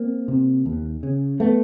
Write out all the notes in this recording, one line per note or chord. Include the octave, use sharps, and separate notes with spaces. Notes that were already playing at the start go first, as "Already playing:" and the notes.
Already playing: A#3 C4
C3
D#2
C#3
A3 B3